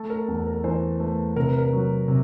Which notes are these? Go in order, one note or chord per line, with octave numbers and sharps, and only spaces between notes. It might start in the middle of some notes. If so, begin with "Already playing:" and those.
Already playing: A3 A4
A#4
E2 A4
A#4
E3 C5
A3 B4
C3 A#4
B4
A#4
F#3
C3